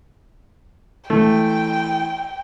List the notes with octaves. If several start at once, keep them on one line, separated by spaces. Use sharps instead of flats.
E3 A3 G5